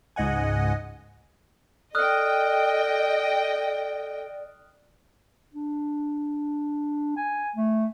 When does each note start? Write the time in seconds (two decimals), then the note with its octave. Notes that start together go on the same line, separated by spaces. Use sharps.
0.16 C#2 G#2 D#5 F#5 G#5
1.95 A4 D5 D#5 G5 D#6 F6 F#6
5.54 D4
7.16 G#5
7.56 A3